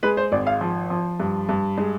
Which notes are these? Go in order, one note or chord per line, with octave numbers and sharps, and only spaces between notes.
G#3 B4
C5
G#1 D5
F5
F3
F3
G2
G2
G#3